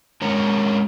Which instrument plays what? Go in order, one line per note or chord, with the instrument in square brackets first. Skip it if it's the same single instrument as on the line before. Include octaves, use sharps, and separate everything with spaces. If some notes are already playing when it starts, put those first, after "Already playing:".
[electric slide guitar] G#3 C#4 A#4 C#5 A#5